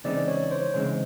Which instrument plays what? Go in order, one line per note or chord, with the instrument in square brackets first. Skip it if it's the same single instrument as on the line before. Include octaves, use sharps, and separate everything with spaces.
[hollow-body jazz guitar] C#3 E3 G#3 C4 D#4 [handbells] D5
[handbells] C#5
C5
[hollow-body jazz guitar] C#3 E3 G#3 C4 D#4 [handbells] C5